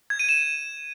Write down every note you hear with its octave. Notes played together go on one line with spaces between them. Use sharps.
G#6
D#7
E7